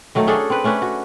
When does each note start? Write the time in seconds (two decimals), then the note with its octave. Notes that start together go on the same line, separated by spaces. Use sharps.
0.15 D#3 F#3 A3
0.27 C#4 D4 G#4 A4
0.50 C4 B4
0.64 A3 C#4 D4 B4
0.82 F#4